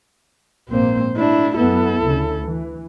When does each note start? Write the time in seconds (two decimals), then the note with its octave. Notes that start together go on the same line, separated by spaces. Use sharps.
0.69 A#1 G#2 A#3 C4 C5
1.16 A3 D4 E4
1.56 F#2 B3 E4 A4
2.04 D2 C#3
2.47 E3